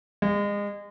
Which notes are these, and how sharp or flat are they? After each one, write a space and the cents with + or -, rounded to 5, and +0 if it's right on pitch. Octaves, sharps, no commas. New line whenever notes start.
G#3 -30